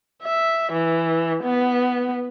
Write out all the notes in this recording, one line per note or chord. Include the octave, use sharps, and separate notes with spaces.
E5
E3
B3